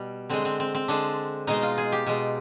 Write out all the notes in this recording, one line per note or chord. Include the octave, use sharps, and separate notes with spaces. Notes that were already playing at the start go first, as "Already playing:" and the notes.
Already playing: B2 G3
D3 G#3 C4
C4
C4
C4
D3 G#3 D4
B2 G#3 D#4
F4
G#4
G4
B2 G#3